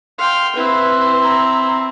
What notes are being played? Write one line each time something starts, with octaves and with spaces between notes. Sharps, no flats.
F5 G5 C6
C4 E4 B4
A#5